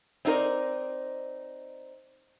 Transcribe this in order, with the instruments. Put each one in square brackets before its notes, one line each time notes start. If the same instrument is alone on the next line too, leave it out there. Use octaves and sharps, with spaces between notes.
[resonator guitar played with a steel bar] C4 D#4 F4 A#4 D5